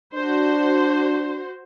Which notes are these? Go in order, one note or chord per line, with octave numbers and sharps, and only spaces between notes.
D4 F#4 C5